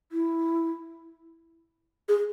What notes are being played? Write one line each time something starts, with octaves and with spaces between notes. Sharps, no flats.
E4
G#4